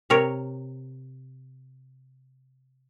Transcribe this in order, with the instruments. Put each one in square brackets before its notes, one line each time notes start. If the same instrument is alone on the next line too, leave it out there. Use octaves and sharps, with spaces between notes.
[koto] C3 A#4 C#5